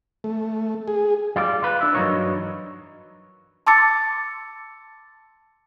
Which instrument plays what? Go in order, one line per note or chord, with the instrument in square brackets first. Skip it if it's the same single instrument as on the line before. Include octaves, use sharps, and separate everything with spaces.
[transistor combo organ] A3
G#4
[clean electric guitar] G3 F4 D5
F4 B4
D4 E4
G2 E3 F#3 D#4 A#4 C#5
[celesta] A5 C6 D6 E6 A6 C#7